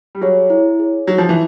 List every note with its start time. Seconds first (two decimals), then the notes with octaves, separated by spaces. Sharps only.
0.15 G3
0.21 F#3 G#4 C#5
0.50 E4
0.79 G#4 C#5
1.07 F#3 D#4
1.18 F3
1.29 E3